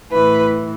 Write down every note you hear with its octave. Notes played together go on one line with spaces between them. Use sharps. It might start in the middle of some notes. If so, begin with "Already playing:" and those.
A2 E3 B4